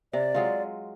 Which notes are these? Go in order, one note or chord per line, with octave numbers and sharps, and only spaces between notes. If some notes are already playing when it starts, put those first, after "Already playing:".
C3 D5
F#3 G#3 F4